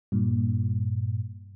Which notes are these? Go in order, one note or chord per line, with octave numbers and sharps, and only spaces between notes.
G2 A#2